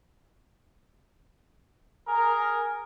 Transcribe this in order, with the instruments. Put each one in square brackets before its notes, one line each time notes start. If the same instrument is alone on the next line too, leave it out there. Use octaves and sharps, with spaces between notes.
[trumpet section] G#4 A#4